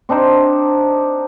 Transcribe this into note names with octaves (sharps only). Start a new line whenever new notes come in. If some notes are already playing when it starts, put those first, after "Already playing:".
C4 D4 D#4 C5